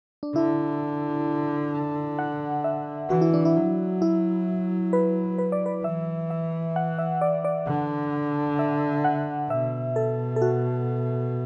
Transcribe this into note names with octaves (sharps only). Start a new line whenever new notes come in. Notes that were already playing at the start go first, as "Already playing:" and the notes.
D4
D3 E4
F#5
E5
E3 F#4
E4
D4
E4
F#3
E4
B4
B4
D5
B4
E3 E5
E5
F#5
E5
D5
D5
D3 F#5
E5
F#5
B2 E5
A4
A4
F#4